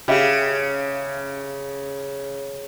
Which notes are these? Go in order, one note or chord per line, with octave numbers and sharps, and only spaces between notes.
C#3 G4 E5 F5